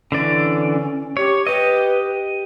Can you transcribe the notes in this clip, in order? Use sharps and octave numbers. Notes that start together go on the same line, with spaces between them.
D3 E3 C#4 D5
G4 C#5
G4 B4 D#5